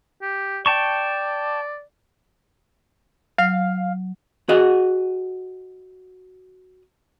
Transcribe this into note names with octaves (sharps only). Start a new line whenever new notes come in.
G4
D5 G5 A5 C#6
F#3 F5
F#4 G#4 D#5 F#5